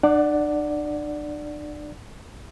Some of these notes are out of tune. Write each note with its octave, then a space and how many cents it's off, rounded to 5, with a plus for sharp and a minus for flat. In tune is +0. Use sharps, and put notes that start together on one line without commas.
D4 +40 D5 +0 F#5 +0